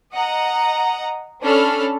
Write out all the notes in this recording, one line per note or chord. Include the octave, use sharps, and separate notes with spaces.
D#5 F#5 A#5
C#4 D4 A4 B5 F6